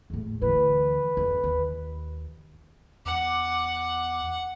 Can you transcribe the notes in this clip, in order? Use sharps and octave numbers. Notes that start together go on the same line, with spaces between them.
E2 A2
D2 E3 B4
F2
D#2
E2 F#5 D6